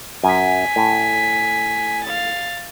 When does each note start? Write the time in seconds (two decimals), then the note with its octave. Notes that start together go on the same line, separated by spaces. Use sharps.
0.23 F#2 G#5 B6
0.76 A2
2.04 F5 A6